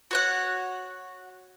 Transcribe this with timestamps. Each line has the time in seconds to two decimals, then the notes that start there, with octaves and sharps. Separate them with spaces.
0.11 F#4 C#5 F#5